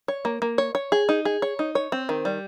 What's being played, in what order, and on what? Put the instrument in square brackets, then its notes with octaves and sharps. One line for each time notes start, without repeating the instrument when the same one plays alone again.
[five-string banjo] C#5
A#3
A#3
C#5
C#5
G#4
D#4
G#4
C#5
D#4
C#5
C4
D#3
G3